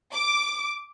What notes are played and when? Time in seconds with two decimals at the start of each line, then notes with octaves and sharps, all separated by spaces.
0.13 D6